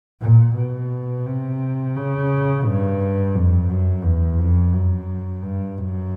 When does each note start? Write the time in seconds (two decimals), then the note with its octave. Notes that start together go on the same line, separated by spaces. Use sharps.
0.22 A#2
0.56 B2
1.26 C3
1.96 C#3
2.65 G2
3.35 F2
3.69 F#2
4.04 E2
4.39 F2
4.73 F#2
5.43 G2
5.77 F#2